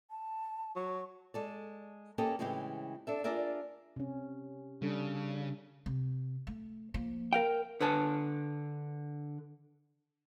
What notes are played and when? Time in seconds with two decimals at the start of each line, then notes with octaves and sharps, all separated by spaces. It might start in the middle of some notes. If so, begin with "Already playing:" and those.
0.10 A5
0.76 F#3 C#6
1.34 G#3 A4 D5
2.18 A#3 C#4 G4 A4 D#5
2.39 A2 C#3 E3 G#3 C4 G4
3.07 D4 A4 E5
3.24 D4 F4 G#4 A#4 D5 E5
3.96 C3 C#4
4.82 C#3 G3 D4 A4
5.86 C3
6.47 A3
6.94 F3 A#3
7.33 A#4 F5 G5
7.81 D3 B4 G#5 A5